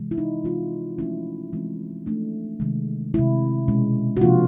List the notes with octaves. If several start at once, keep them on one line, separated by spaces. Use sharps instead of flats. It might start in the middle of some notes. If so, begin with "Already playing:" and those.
Already playing: C3 E3 G#3
E4
D#4
C3 E3 G#3 C4 F4
F3 A3 C#4 E4
E3 G#3 C4
F3 A3 D4
C3 D#3 G#3
C3 D#3 G#3 E4
B2 G#3 C#4
F#4
C3 F3 A#3 D4 F4